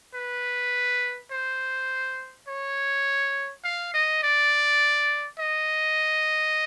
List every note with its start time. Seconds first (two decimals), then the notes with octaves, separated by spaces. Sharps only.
0.14 B4
1.31 C5
2.48 C#5
3.64 F5
3.94 D#5
4.23 D5
5.39 D#5